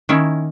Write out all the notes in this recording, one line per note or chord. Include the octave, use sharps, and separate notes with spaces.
D#3 A#3 C#4 E4